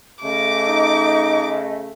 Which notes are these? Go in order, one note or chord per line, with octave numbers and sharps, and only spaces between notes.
C#3 A3 D#5 D6
D#4